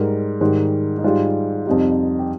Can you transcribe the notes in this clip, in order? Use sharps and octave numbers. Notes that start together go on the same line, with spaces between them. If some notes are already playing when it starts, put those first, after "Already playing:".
Already playing: G#2 G3 A#4
G#2 D#3 G3
D#4
G#2 G3 F4
F2 C3 G3 D#4
G4